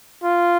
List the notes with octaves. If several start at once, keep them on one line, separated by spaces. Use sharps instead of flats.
F4